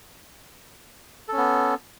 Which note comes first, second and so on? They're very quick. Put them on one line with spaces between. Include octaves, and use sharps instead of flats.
A4 C#4 B3